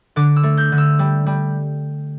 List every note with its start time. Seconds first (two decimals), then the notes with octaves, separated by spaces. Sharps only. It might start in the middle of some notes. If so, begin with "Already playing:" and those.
0.16 D3 D6
0.36 E6
0.43 A3
0.57 G6
0.72 D3
0.78 E6
0.99 G3
1.27 G3